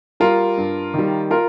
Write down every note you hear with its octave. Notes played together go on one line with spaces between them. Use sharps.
G3 F4 A#4
G2
D#3 G3
F4 A#4